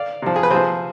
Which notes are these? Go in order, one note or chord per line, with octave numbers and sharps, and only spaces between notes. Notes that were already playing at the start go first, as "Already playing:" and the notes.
Already playing: D5 F5
C3 F3
G#4
B4
C3 F3 G#4 C5